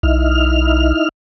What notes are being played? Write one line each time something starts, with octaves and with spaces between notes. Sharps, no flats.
B1 D#4 E4 F6